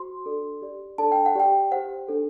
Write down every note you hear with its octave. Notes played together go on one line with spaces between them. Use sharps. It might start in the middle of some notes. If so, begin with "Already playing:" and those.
Already playing: F#4 C5 C6
D4 A4 D5
G4 D5
D4 A4 D5 A5
G5
F#5
G4 D5 G5
G4 C5 F#5
D4 A4 C5